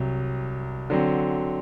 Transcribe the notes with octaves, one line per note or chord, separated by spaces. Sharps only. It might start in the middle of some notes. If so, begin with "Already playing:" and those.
Already playing: C2 C3 F#3
D3 F#3 C4